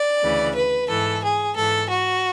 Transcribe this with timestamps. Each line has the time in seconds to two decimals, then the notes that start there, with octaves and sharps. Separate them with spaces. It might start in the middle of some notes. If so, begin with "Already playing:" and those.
Already playing: D5
0.23 D2 C#3 E3
0.56 B4
0.89 G#2 E3 A4
1.22 G#4
1.55 G#2 E3 A4
1.88 F#4